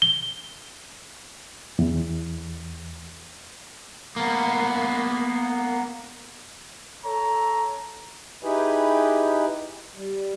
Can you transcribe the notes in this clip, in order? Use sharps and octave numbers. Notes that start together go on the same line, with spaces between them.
G7
E2
A#3 B3
A4 C#5 A#5
D#4 E4 G4 G#4 B4
G3